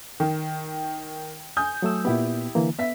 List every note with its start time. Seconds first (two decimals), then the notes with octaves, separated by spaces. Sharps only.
0.20 D#3
1.57 G#5 D#6 G6
1.82 F#3 A3 E6
2.05 A#2 B3 E4 G4
2.55 D3 E3 A#3
2.79 B3 E5 B6